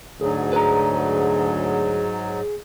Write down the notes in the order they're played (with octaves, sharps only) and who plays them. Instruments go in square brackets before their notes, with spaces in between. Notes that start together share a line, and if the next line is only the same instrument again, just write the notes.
[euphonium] D2 [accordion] G#2 F#3 [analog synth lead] G#4
[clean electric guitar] B4 A#5